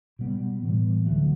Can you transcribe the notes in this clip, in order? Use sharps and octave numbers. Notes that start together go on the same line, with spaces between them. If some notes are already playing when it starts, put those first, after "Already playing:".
B2 G3 B3
A2 E3 G3 B3
D2 D3 F#3 A3